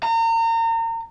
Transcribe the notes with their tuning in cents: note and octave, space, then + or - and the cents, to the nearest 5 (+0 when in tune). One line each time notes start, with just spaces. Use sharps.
A#5 -35